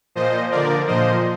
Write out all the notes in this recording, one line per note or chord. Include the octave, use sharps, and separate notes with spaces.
A#2 F3 C5 D#5
D3 F3 A#4 D5
A#2 F3 C5 D#5